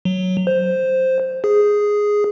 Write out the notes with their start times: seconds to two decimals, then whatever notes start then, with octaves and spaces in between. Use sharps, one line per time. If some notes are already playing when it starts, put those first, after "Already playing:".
0.05 F#3
0.47 C5
1.44 G#4